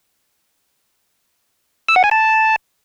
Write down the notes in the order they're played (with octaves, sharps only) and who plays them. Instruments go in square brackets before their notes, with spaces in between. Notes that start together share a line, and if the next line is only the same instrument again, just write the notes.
[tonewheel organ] E6
F#5
G#5
A5